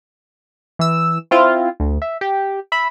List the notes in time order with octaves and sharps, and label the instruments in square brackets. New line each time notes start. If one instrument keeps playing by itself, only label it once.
[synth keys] E3 E6
C4 E4 F4
D2
E5
G4
E5 B5